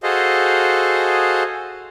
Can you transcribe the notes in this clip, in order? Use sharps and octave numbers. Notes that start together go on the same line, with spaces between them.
F#4 G#4 A4 C5 D#5 F5